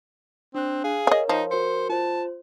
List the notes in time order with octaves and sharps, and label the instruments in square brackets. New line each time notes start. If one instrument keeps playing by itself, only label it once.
[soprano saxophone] C4 [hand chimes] D4 F#6
[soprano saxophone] G#4 [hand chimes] F5
[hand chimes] A#4 C#5 [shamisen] D#5 G#5
[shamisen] F3 [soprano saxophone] D#4
[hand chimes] F#4 A#4 C#7 [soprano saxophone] C5
[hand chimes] F4 C5 [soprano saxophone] A5